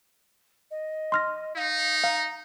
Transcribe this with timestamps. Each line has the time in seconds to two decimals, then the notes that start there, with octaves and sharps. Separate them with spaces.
0.71 D#5
1.12 C6 F6 A#6
1.56 D#4 F5
2.04 F5 A#5